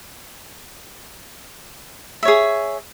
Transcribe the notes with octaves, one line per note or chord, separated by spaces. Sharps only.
G#4 C#5 E5